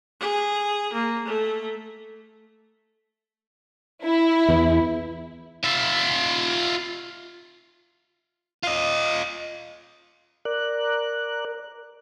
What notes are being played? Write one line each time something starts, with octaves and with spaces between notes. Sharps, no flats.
G#4
A#3
A3
E4
E2 E3
F4 E5
F4 D#5
A#4 D5 F#6